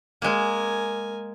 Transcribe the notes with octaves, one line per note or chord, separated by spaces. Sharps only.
G#3 A#3 A#4 G#5